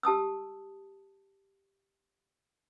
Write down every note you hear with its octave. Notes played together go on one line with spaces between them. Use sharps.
G4 A5 D#6 E6